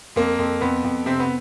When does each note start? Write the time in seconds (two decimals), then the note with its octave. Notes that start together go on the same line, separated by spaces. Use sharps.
0.16 F2 A#3
0.39 F2
0.61 F2 B3
0.84 F2
1.06 C3 C4
1.20 B3